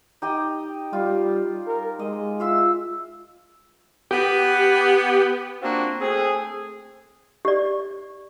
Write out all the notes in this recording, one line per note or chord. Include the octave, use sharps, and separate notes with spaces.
D#4 G4 D#5
G3 F4
A#4
G#3 D#5
F4 E5 E6
B3 G4
A#3 C4 D4 F4 F#4
A3 C4 G#4
G4 D5